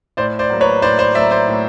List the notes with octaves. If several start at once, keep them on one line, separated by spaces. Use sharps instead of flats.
A2 C5 D5
C5 D5
F#3 A#3
B4 C#5
A2 C5 D5
C5 D5
F#3 A#3 D5 E5
C5 D5
A2